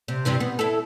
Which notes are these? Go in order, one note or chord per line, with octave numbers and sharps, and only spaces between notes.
C3
G2 C3 E3
B3
E4 A4